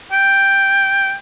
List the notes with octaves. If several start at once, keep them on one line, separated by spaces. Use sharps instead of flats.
G5